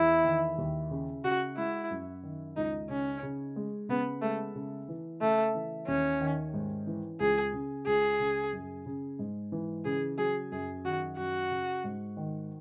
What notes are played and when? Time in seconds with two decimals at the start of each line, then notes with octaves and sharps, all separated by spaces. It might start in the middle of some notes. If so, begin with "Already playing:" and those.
Already playing: E2 E4
0.24 D#3
0.58 D#2
0.91 C#3
1.24 C#3 F#4
1.57 G#3 E4
1.90 F#2
2.23 D#3
2.57 C#2 D#4
2.89 C#3 C#4
3.23 C#3
3.56 G#3
3.89 C#3 B3
4.22 G#3 A3
4.55 C#3
4.88 E3
5.21 C#3 A3
5.55 E3
5.87 D#2 C#4
6.21 D#3
6.54 G#2
6.87 E3
7.20 C#2 G#4
7.53 C#3
7.86 C#2 G#4
8.20 C#3
8.53 F#2
8.86 C#3
9.19 G#2
9.52 E3
9.85 C#3 G#4
10.18 F#3 G#4
10.52 F#2 G#4
10.85 D#3 F#4
11.17 F#2 F#4
11.51 C#3
11.84 G#2
12.17 D#3